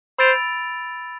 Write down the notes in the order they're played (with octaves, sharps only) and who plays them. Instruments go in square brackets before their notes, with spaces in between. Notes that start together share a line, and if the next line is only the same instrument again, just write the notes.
[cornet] C5 [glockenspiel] B5 E6 A6 D7 F7